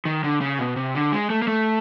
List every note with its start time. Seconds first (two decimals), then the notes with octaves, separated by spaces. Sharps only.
0.05 D#3
0.24 D3
0.41 C#3
0.59 B2
0.76 C3
0.95 D3
1.12 G#3
1.30 A3
1.42 A#3
1.47 A3